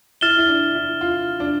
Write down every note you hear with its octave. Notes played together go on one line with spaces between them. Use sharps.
E4 F6 A6 E7 G7
E4
D4
E4
F4
D4